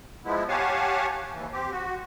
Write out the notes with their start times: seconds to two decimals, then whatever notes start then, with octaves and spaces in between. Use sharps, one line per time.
0.25 F3 G#3 B3 E4
0.49 G4 C#5 F5 F#5 G#5 A5
1.33 D#2 E3
1.52 C4 G4
1.71 F#4